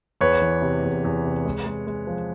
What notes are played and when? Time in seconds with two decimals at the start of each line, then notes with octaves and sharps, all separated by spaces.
0.21 E2 B4 C#5
0.42 E3
0.62 C3
0.83 E2
1.04 E2
1.25 C3
1.45 G#3
1.66 G#3
1.87 G#3
2.07 F3